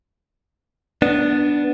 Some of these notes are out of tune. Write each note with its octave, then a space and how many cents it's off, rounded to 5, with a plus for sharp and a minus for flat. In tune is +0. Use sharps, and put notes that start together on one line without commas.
B3 +0 D4 +0